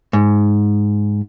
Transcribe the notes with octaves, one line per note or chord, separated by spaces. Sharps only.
G#2